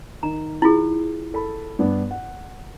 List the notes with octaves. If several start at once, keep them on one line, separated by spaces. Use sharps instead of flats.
D#3 A#5
E4 F4 G#4
A4 B5
G2 B3 D4
F#5